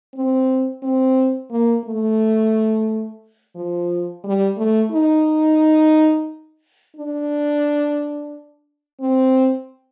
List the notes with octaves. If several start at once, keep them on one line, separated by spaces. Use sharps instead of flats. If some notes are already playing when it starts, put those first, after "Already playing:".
C4
C4
A#3
A3
F3
G3
A3
D#4
D4
C4